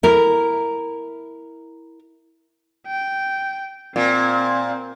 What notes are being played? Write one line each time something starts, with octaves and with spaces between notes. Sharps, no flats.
E4 A#4
G5
A#2 C4